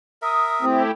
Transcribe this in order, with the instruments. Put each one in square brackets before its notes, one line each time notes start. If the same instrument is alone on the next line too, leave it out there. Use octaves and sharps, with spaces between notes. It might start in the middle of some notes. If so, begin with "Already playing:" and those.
[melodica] A#4 E5 [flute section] D#6
[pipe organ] A3 E4 G4 [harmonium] C4